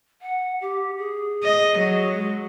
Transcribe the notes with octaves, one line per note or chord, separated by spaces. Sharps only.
F#5
G4
G#4
D#5
F#3
G#3